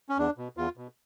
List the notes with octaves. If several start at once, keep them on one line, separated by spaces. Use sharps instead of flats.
C#4
E2 D4
B2
E2 F4
B2